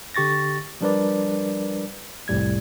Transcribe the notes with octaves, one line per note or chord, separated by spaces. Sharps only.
D3 G4 C#6 A6 A#6
F3 G3 D4 A#4 B4 D5
C2 F2 A2 G3 G#6